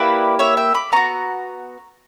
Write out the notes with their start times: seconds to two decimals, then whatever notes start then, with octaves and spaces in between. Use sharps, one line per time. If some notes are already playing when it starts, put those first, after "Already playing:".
Already playing: A#3 E4 G4 B4 D5
0.39 C#5 E5
0.57 E5 G5
0.74 B5 D6
0.92 B3 F#4 A#5 C#6